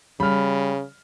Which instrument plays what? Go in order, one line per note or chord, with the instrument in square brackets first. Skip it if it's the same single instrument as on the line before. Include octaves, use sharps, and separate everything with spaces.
[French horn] C#3 [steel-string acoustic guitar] G3 [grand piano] B5 F6